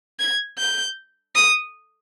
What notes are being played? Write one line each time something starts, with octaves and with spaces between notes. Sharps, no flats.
G#6
G6
D#6